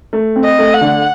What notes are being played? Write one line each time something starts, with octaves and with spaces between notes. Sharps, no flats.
A3
C4
D#5
A3
F#5
D3